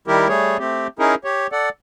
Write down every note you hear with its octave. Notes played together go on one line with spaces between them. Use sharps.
D#3 G3 E4 G4 A#4
G3 A3 G#4 C#5
A3 C4 G4
C#4 D#4 E4 G#4 A#4
G4 C#5
A4 D5 F#5